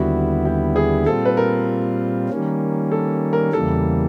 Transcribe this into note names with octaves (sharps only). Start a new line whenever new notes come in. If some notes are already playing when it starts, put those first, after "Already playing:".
Already playing: D#2 D3 G3 B3 E4 F#4
G4
G#4
A#2 G3 C4 F4 A4
B4
A#4
D#3 G3 A#3 C#4
A4
A#4
E2 C#3 E3 G3 A#3 A4